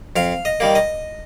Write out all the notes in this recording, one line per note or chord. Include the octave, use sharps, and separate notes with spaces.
F2 F5
D#5
D#3 G3 A#3
D#5